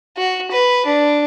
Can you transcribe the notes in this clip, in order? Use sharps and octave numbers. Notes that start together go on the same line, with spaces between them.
F#4
B4
D4